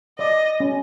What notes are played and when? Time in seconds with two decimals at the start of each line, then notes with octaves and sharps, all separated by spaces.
0.18 D5 D#5
0.60 C#4